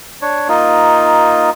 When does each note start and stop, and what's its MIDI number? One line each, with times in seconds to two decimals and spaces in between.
0.22 0.48 62
0.22 0.48 73
0.48 1.50 58
0.48 1.50 63
0.48 1.50 65